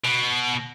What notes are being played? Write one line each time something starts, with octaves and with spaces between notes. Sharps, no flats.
B2